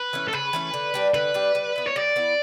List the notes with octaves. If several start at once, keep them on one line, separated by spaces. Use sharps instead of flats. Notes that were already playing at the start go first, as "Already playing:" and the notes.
Already playing: B4
E3 A3 C#4
A4
C#3 B4
E3 A3 C#4
D3
G3 D4 G4
D3 B4
G3 D4 G4
G3
B3 E4
C#5
G3 D5
B3 E4